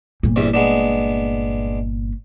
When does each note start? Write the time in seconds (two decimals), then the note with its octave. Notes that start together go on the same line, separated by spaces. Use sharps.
0.23 G1 A#2
0.36 E2 G2 C3
0.54 G#3 B3 D4